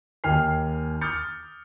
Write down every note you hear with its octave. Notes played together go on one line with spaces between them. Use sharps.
D#2 A#3 G5 G#5 F6 C7
D6 D#6 F6 G6 A6 C#7